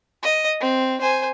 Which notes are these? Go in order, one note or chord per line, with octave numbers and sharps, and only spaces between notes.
D#5
C4
C5 G#5